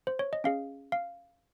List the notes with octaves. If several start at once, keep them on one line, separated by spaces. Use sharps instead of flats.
C5
C#5
D#5
C#4 G#4 F5
F5